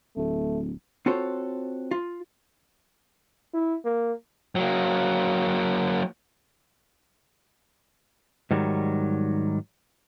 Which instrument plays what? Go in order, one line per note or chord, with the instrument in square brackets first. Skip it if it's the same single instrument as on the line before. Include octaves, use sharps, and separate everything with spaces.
[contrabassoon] D1 [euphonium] A3
[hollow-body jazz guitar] C4 F4 F#4 A4 C5 C#5
F4
[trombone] E4
A#3
[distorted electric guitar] F#3 A#3
[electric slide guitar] G#2 D#3 F#3 G3